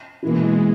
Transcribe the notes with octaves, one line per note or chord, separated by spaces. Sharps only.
B2 E3 G#3 A#3 E4